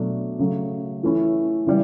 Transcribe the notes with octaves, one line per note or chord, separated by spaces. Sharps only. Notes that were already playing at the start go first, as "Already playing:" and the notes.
Already playing: B2 F#3 A3 D4
C#3 F#3 A3
E3 A3 C#4 E4
C#3 E3 G3